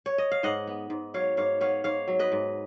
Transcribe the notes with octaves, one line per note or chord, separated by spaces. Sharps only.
C#5
D#5
F5
G#2 D#5 F#5
B3
G#2
F#3 C#5 F5
G#2 C#5 F5
B3 C#5 F5
G#2 C#5 F5
F#3
B4 D#5
G#2